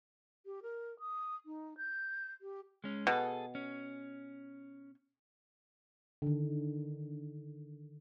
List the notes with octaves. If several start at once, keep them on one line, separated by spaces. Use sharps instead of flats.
G4
A#4
D#6
D#4
G6
G4
G#3 C#4
B2 G#4 A4
C#4
D3 D#3